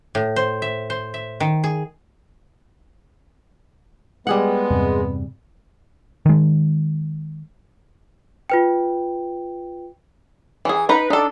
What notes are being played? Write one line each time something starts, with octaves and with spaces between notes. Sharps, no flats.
A2
C5
E5
C5
E5
D#3
G#4
G3 G#3 B3 G#4 F#5
E2 G2 C3
D#3 G#3
F4 B4 G5
E3 G#4
D#4 B4 A#5
D4 D#4 A4